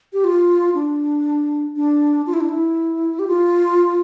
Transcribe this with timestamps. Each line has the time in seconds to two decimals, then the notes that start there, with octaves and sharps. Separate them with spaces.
0.13 G4
0.24 F4
0.75 D4
1.76 D4
2.27 F4
2.34 E4
2.41 D4
2.49 E4
3.19 G4
3.27 F4